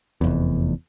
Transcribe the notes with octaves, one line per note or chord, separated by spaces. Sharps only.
F1 E2